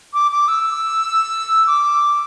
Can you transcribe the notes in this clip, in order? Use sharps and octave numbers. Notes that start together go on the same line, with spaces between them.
D6
D6
E6
D6